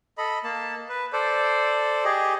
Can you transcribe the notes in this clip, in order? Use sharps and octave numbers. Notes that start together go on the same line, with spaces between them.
A4 D#5 B5
A#3 A5
B4
A4 C5 D5
G4 G#4 D#5